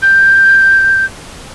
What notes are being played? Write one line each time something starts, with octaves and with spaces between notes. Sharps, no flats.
G6